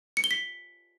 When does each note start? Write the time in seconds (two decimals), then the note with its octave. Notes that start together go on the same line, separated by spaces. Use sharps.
0.17 C#7
0.24 G7
0.31 B6